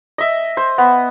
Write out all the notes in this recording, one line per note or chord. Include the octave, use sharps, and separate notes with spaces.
D#5 E5
C5
B3